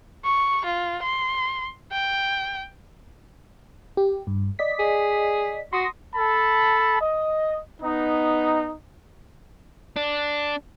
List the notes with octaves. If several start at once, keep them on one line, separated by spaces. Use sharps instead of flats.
C#6
F4
C6
G5
G4
G2
D5 D#5 B6
G#4
F#4 C6 D#6 A#6
A4 A5 B5
D#5
B3 D#4
D4